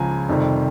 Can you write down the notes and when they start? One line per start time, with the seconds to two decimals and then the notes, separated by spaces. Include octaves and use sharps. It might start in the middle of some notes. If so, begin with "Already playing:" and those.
Already playing: C#2 C#3 F3 G#5 A#5
0.29 F2 C3 D#3 G3